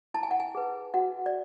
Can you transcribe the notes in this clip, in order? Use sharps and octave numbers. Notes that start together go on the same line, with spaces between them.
E4 A5
G#5
F#5
G#5
G#4 B4
F#4 F#5
D5